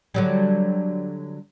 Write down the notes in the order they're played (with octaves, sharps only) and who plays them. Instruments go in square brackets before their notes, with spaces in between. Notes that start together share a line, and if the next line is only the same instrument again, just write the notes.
[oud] D3 F#3 G3